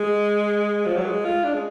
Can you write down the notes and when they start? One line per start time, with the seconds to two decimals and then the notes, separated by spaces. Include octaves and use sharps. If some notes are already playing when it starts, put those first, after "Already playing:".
Already playing: G#3
0.86 F3
0.96 F#3
1.06 G#3
1.25 F4
1.44 D4
1.54 G#3